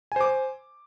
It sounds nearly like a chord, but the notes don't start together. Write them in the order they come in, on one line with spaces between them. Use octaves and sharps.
G#5 C5 D6